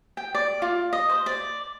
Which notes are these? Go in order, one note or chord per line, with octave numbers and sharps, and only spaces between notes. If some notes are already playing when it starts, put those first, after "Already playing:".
G5
D5
F4
D#5
C5
D5